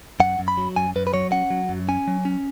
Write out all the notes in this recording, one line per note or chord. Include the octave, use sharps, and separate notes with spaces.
F#2 F#5
F#2
B5
F#3
F#2 G#5
F#2 B4
B4
F#3 C#5
C#4 F#5
F#3
F#2
C#4 G#5
F#3
C#4